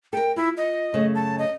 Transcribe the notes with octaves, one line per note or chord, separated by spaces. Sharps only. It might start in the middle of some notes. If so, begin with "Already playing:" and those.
A4 A#4 G5
E4 F4
D#5
F#2 C#3 A3
A5
D#5